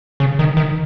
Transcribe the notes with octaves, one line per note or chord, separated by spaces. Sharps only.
C#3
D#3
D#3